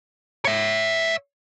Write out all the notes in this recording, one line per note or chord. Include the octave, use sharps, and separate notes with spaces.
C#5 E5